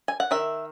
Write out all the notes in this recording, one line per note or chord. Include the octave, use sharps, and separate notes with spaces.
G#5
F#5
D#3 E5